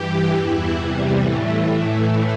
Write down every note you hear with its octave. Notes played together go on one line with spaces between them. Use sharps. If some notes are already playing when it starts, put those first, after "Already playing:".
Already playing: G2 E3 G4
E2 E3 E4
E2 C3 E3 G3
A2 E3 A3